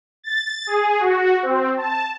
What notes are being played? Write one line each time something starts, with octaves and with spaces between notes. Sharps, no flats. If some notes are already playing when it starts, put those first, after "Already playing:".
A6
G#4
F#4
C4
A5